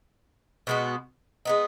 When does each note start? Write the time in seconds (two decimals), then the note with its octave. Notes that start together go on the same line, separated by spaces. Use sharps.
0.67 B2 G#3 B3 F#4
1.45 G#3 B3 D#4